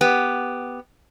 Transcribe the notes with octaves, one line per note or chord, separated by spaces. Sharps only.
B3 G4